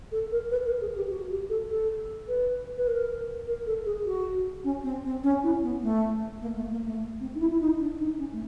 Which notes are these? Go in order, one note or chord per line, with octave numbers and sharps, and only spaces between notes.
A4
A#4
B4
A#4
G#4
G4
F#4
G4
A4
A4
B4
B4
A#4
A#4
A4
G#4
F#4
C#4
C4
C4
C#4
E4
B3
A3
A#3
A3
A#3
A3
C4
D#4
E4
E4
D#4
D4
D#4
C#4
A3